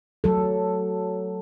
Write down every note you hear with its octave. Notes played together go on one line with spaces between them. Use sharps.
F#3 A4